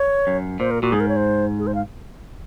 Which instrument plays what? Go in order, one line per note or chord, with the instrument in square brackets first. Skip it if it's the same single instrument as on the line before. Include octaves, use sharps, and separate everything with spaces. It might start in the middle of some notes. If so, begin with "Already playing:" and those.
Already playing: [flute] C#5
[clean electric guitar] F#2
[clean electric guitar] A#2 [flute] C5
[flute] A#4
[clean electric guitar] A#2 [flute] F#4
[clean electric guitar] G#2 [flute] G#4
[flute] A#4
C#5
C5
G#4
C5
F5